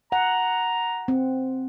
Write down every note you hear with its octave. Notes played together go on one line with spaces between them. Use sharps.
F#5 A#5
C4